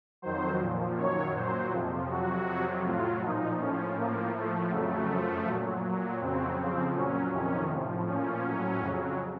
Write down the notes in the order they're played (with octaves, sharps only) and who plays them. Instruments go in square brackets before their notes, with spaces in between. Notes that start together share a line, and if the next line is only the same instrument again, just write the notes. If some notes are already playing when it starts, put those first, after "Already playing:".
[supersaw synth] F2 D#3 F#3 C5
A#2 F3
F#2 D#3 F#3 C#5
A#2 F#3 C5
F2 C3 F3
F2 C3 F#3 F#4
F2 C3 F#3
A2 F#3 F4
A#2 F3 D#4
A2 F3 C#4
A2 F3 A#3
A2 F3 A3
F2 C#3 F#3 A3
F#2 F3
A#2 F#3
A#2 F#3
F2 C#3 F#3 C4
F2 C#3 F3 C4
A#2 F#3 C#4
F2 C3 D#3 C#4
A2 F3
A#2 F3 C#4
A2 F#3
F2 C#3 F#3